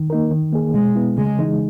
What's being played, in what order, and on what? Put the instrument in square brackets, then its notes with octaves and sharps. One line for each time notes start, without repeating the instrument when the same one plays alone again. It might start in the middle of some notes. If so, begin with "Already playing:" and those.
Already playing: [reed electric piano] D#3
A#3 D#4 A#4
D#3
A#3 D#4 G#4
[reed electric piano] B2 [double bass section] G#3
[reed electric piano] G#3 B3 E4
[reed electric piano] C#3 [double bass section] G#3
[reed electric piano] E3 G#3 D#4